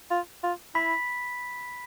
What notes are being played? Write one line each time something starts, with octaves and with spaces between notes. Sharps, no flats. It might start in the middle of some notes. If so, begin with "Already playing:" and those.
F4
F4
E4 B5 B6